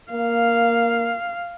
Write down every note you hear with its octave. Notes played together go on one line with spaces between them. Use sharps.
A#3 F5